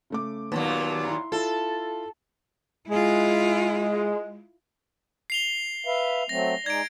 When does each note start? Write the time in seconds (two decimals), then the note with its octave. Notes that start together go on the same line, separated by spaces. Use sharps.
0.10 C#3 A3 D6
0.52 D#2 A#2 F#3 B3
1.05 E4 A#5 C6
1.32 E4 F4 A4
2.90 G#3 E4 F4
5.30 C7 F7 G7
5.86 B4 E5 F5
6.29 F#3 A3 C4 A#6
6.66 G#3 D#4 D5 G#6 D7